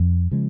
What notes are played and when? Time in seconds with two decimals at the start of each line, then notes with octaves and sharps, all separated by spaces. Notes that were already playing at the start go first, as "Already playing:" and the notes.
Already playing: F2
0.31 C#3 F3 G#3